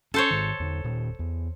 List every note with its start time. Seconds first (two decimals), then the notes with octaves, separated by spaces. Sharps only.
0.14 C#4 A4 C5 C#5
0.30 G#2 D#3
0.60 E2 D3
0.84 D#1 A#2
1.19 E2